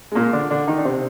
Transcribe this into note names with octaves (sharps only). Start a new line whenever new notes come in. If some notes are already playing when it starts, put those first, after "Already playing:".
G#3
A#2 A#3
D3 D4
D3 D4
D#3 D#4
D4
C3 C4